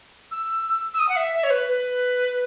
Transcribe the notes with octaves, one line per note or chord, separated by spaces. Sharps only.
E6
E6
D#6
F#5
E5
E5
C#5
B4
B4